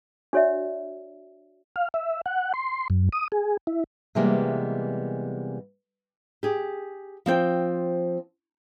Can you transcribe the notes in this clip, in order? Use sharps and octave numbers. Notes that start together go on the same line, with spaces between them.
D4 F#4 C#5 D5 E5
F5
E5
F#5
C6
F#2
D#6
G#4
E4
C3 E3 G3 G#3 A#3 B3
G4 G#4
F3 C4 G5